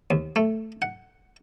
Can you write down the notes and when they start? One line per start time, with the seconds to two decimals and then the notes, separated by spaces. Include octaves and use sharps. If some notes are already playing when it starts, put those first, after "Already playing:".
0.11 D#2
0.36 A3
0.82 F#5